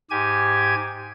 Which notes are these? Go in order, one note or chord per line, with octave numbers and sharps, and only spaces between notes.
G#2 G4 G#5 G#6